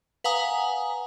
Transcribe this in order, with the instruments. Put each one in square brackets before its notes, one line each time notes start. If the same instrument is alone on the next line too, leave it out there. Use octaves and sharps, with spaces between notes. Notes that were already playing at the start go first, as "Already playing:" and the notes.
[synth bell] B4 F5 F#5 G#5 A#5 D#6